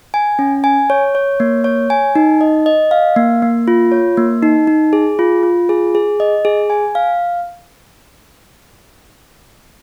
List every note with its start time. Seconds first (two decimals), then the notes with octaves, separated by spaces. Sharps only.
0.14 G#5
0.39 C#4
0.64 G#5
0.90 C#5
1.15 C#5
1.40 A#3
1.64 C#5
1.90 G#5
2.15 D#4
2.41 D#5
2.66 D#5
2.91 F5
3.16 A#3
3.42 A#3
3.68 F4
3.92 C#5
4.17 A#3
4.43 D#4
4.67 D#4
4.93 G#4
5.19 F4
5.43 F4
5.69 G#4
5.95 G#4
6.20 D#5
6.45 G#4
6.70 G#5
6.95 F5